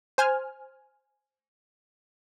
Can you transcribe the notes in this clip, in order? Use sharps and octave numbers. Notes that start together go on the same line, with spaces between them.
C5 G#5 F6